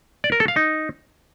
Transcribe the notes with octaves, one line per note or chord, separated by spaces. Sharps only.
D5
A#4
A4
F5
D#4